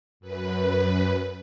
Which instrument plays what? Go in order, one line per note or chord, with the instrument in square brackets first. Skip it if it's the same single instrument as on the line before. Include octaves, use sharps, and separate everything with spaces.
[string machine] F#2 B4